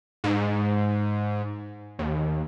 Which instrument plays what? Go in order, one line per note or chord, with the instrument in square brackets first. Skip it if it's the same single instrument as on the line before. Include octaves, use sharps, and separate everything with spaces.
[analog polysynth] G#2
D#2